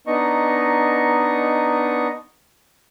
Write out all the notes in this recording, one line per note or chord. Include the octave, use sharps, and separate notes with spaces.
B3 D4 D#4 D#5 A#5 C#6